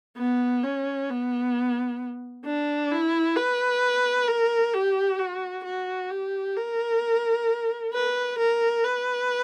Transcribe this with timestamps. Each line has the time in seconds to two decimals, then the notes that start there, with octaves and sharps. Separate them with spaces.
0.17 B3
0.63 C#4
1.09 B3
2.45 D4
2.91 E4
3.36 B4
4.28 A#4
4.74 G4
5.19 F#4
5.64 F#4
6.10 G4
6.56 A#4
7.93 B4
8.38 A#4
8.84 B4